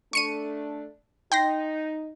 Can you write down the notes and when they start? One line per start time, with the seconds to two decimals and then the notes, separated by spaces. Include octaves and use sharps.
0.13 A3 D4 C#6 C#7 D#7
1.32 D#4 G5 C6 A#6